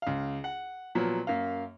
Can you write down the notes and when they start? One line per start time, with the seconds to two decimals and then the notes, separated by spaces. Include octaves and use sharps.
0.02 C#2 F5
0.44 F#5
0.95 A#2 F3 F#3 B3
1.27 F#2 A#3 F5